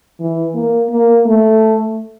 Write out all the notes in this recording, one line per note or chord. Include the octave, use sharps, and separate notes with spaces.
E3
A#3
A#3
A3